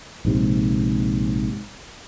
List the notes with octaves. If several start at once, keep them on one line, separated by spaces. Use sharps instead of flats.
A#1 G#2 C3